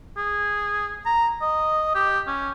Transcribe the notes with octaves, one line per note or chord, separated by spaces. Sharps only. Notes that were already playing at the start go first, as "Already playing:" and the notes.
G#4
A#5
D#5
G4
C#4